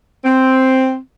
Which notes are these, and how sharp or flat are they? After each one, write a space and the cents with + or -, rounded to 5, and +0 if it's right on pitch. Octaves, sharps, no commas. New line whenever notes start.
C4 +0